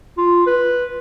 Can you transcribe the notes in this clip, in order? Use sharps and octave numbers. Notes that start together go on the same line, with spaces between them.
F4
B4